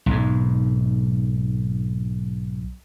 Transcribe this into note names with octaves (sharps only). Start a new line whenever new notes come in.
B1 G#2